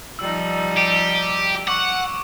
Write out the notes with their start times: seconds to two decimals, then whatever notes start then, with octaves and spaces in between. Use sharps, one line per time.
0.19 F3 G3 D#4 E6
0.77 G4 D7 D#7
1.67 F#5 C#6 D6